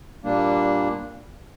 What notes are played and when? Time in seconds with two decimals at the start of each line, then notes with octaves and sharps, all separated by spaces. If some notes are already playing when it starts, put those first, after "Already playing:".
0.24 A#2 G3 A#3 D4